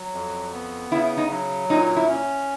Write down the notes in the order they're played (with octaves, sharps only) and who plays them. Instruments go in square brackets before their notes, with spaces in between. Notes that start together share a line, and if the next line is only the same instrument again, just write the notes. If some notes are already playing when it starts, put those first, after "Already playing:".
Already playing: [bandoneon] F#3
F2
B3
[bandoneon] C#3 [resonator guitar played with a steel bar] E4
[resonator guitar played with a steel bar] D#4
[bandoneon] F#3
[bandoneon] A#2 [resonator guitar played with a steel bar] D#4
[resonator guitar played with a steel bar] E4
[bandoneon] C#4